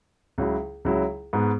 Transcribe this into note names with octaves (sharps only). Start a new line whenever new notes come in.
C#2 C#3 F#3 E4
C#2 C#3 F#3 E4
G#2 G#3 B3